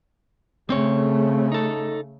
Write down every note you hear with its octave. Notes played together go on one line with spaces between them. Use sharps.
C#3 A3 C4 C#5
D#4 A4